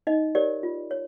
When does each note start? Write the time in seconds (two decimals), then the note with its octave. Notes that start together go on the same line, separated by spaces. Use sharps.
0.07 D#4 D#5
0.35 G4 A#4 C#5 D5
0.63 F4
0.91 C#5